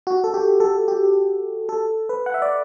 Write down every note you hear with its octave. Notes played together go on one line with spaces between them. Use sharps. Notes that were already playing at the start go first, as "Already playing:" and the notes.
F#4
A4
G4
A4
G4
A4
B4
F#5
E5
D5